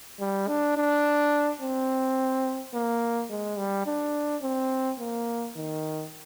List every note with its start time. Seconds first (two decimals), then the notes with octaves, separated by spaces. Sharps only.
0.20 G3
0.48 D4
0.77 D4
1.62 C4
2.74 A#3
3.30 G#3
3.58 G3
3.86 D4
4.42 C4
4.99 A#3
5.56 D#3